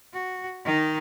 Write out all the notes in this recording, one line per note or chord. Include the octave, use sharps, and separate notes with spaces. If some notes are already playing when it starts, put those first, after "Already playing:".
F#4
D#3 D#4